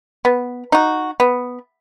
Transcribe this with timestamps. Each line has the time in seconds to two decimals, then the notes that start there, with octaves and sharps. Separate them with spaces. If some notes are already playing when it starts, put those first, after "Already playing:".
0.25 B3
0.72 D#4 F#4
1.20 B3